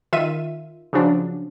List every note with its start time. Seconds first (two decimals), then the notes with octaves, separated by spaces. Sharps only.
0.13 D#3 F4 E5 D#7
0.93 C#3 F3 F#3 D4